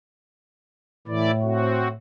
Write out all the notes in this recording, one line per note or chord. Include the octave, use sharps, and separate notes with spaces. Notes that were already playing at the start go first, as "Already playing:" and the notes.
A2 E3 E4 D5
C4 F#4